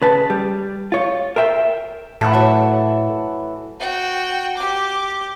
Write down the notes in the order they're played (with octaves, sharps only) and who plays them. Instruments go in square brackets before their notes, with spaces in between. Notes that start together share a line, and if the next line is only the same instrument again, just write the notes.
[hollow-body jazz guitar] C#3 B4 A5
G3
F4 C#5
A#4 C5 E5 G5
[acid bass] A2 [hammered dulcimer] E3 F#5 A5 [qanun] A3
[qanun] F#3 E5
[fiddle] F#4 G5
G4 D6